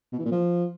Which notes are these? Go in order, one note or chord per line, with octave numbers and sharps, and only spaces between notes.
B2
E3
A#2
F3